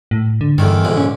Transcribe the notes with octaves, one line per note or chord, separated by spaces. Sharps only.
A2
D3
E2 G2 D3 D#3
A#1 G#2 D3
C#4